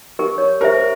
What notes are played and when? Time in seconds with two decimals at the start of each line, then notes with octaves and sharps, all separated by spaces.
0.19 G4 A#4 C#6
0.38 C#5
0.61 G4 A#4 C5 E5